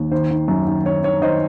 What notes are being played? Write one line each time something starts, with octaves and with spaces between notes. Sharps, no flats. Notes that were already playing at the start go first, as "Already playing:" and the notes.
Already playing: D#2
D#3 C5
D#3
F#2
D#3
D#3 C#5
D#3 C#5
D#3 C5 D#5